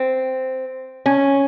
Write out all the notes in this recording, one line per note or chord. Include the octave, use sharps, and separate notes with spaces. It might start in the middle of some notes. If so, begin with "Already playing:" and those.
Already playing: C4
C#4